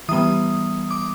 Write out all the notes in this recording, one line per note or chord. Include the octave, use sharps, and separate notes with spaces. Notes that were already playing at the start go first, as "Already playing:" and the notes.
E3 G3 B3 D#6
D6